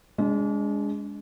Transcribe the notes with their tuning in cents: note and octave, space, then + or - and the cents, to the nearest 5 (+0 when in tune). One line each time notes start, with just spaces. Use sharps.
G#3 -10 D4 -40